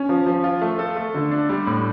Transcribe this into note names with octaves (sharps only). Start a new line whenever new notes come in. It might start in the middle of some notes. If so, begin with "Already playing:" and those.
Already playing: C#4
F3
F3
F4
A3
A4
A3
D3
D4
G3
A2